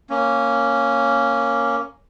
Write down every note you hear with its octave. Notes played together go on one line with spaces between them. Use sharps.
A#3 C#4